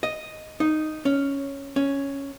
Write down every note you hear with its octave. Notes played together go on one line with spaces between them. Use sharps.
D#5
D#4
C#4
C#4